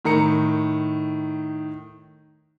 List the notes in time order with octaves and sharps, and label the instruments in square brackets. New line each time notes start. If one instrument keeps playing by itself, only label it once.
[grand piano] A2 D#3 A#5 C#7